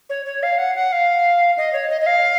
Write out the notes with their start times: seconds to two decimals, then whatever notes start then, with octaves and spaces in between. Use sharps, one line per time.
0.10 C#5
0.26 C#5
0.43 F5
0.58 F#5
0.75 F#5
0.92 F5
1.57 D#5
1.73 C#5
1.90 D#5
2.01 D#5
2.06 F5